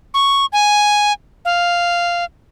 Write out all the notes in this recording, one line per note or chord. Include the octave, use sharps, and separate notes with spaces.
C#6
G#5
F5